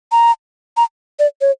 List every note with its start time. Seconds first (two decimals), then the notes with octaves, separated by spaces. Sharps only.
0.12 A#5
0.77 A#5
1.19 D5
1.41 C#5